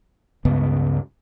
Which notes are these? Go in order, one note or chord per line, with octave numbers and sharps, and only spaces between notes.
C#2 G2 C#3 B3